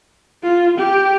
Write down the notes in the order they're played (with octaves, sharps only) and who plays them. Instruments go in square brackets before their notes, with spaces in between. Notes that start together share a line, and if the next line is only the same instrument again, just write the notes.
[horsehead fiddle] F4
G4